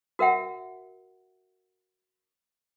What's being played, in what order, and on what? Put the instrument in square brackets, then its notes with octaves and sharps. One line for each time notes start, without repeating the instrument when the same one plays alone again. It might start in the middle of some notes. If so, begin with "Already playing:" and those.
[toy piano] F#4 A#4 E5 F#5